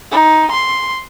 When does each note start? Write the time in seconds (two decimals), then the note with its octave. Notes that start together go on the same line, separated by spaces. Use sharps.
0.11 D#4
0.51 C6